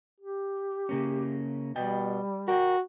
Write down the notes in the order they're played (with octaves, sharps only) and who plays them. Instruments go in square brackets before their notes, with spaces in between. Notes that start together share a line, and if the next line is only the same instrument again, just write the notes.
[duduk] G4
[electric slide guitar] C#3 A#3 C#4
[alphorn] B2 [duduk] G3 [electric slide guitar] D5 D#5 G5
[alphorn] F#4 [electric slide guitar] A#4 D5 G5